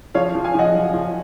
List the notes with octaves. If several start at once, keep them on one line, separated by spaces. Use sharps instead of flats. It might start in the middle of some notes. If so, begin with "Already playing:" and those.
F3 C#5 F5
F3
F5 G#5
F3 D#5 F#5
F#2
F3